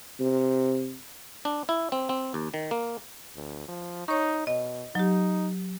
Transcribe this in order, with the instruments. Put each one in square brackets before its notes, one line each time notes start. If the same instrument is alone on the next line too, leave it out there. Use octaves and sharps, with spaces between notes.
[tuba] C3
[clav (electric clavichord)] D4
E4
C4
C4
D#2
D#3
A#3
[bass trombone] D2
F3
[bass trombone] D#4 [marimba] C#5 C#6
[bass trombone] B2 [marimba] D#5
[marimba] F#3 G4 [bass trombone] D#4